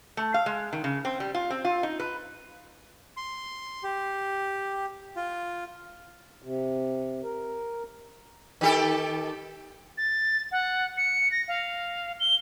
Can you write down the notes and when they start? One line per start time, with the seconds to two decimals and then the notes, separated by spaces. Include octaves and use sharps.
0.17 A3
0.34 F5
0.46 G#3
0.73 D#3
0.84 C#3
1.05 C4
1.20 G3
1.35 F4
1.50 C4
1.65 F4
1.83 D#4
2.00 B4
3.17 C6
3.83 G4
5.16 F4
6.42 C3
7.23 A#4
8.61 D#3 G4 A4
9.98 A6
10.51 F#5
10.97 C#7
11.32 A#6
11.48 F5
12.20 G7